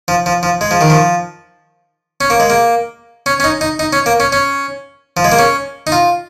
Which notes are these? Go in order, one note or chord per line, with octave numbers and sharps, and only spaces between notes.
F3
F3
F3
G#3
F3
D#3
F3
C#4
A#3
G#3
A#3
C#4
C#4
D#4
D#4
D#4
C#4
A#3
C#4
C#4
F3
G#3
A#3
C#4
D#4
F4